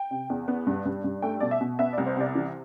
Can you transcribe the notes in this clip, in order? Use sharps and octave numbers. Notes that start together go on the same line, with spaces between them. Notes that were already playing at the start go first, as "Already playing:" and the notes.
Already playing: G5
C3
E2
B3
G2
G2
G2
A3 G5
B2 D5
E5
B2
B3 E5
C2 D5
C5
C3 D5
E3